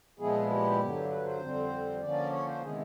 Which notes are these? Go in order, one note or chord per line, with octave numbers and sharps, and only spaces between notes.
A#2 F3 G#3 B3 E4 G#4
G4
G2 D3 F#3
B4
C5
F2 D3 G3 C4
D3 F3 A#3 C#4 D5
C#5
C5
C3 D#3 G#3 B3 E4 G#4